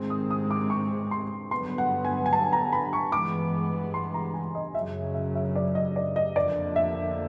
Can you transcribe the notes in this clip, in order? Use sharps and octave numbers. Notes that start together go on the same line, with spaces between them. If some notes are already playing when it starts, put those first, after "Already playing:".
Already playing: G#2 D#3 G#3 C4
D#6
D#6
D6
C#6
C6
G2 D3 F#3 B3 C6
F#5
G#5
G#5
A5
A#5
B5
C#6
G2 E3 G#3 B3 D6
C6
A#5
G#5
D#5
F#2 C#3 F#3 E5
E5
E5
D5
D#5
D5
D#5
F2 D3 F3 A#3 D5
E5